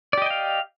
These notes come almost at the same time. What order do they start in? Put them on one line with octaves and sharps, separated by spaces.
D5 G4 D#5 G5 F5